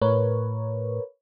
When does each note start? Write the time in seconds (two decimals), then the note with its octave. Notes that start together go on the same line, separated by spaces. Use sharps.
0.02 A2 A#4 B4 C#5